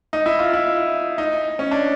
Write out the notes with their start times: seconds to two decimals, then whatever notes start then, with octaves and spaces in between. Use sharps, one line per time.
0.13 D#4
0.26 E4
0.39 F4
0.53 E4
1.18 D#4
1.59 C#4
1.71 D4